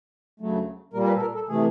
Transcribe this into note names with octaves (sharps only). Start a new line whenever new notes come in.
D2 C#3 F#3 A3
A#2 G3 A#3 A#4
A#4
B4
A4
A#4
A4
C3 E3 A3 G#4